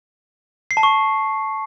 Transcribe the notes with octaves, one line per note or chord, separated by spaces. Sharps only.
C7
A5
C#6